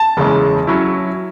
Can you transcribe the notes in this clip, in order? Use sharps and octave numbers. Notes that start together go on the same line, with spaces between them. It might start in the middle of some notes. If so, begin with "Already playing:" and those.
Already playing: A5
F#1 E2 C#3 G#3 C#4
F#3 C#4 E4